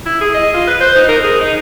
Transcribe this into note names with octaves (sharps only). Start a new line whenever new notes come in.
E4
G#4
D#5
F4
B4
C5
D#4
A#4
G#4
D#4